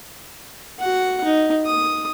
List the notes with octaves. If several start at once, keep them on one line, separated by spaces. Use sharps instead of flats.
F#4 F#5
D#4
D#6